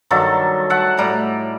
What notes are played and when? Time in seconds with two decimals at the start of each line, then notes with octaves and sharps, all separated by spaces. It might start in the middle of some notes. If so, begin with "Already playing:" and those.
0.11 G2 D#3 F#3 A4
0.70 E5 F#5 A5
0.97 A2 G3 A#5